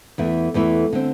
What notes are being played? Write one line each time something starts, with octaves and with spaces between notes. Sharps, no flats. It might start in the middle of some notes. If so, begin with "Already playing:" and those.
E2 E3 A3 E4
E2 E3 A3 E4
D3 C4